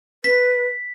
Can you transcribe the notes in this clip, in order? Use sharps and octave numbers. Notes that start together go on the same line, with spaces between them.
B4 B6